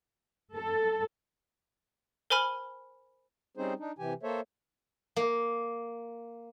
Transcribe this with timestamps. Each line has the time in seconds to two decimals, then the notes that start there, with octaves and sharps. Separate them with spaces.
0.55 A4
2.30 A#4 C5 G#5 B5 F6
3.57 G3 C4 C#4 D#4 G#4 C5
3.79 D4 D#4
3.99 C3 E3 G4 G#5
4.23 A#3 A4 C5 C#5 E5
5.16 A#3